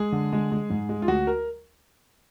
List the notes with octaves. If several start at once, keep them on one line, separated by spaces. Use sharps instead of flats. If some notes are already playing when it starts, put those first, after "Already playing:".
Already playing: G#3 G#4
D3
G#3
G#3
G#2
G#3
F4
D2 F#4
A#4